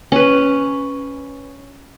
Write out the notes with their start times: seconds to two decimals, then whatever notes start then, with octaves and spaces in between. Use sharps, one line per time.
0.12 C#4 B4